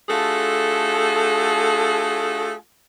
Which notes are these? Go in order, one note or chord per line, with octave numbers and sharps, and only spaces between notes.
A3 D4 F4 F#4 G#4 A4